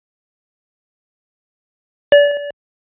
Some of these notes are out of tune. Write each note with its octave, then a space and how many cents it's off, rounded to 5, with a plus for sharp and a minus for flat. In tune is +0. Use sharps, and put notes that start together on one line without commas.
D5 -30